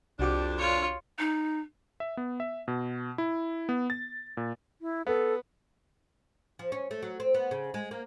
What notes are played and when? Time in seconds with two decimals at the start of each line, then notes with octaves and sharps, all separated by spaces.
0.19 C2 F2 D4 F#4 G4 D6
0.58 F4 C#5
1.19 D#4
2.00 E5
2.17 B3
2.40 E5
2.68 B2
3.18 E4
3.69 B3
3.90 A6
4.37 A#2
4.81 E4
5.07 B3 A4
6.59 F3
6.72 C#4
6.91 A3
7.02 F#3
7.20 C4
7.34 B3
7.51 C#3
7.74 G#3
7.91 A#3